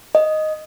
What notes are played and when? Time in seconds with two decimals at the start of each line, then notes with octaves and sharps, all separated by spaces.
0.15 D#5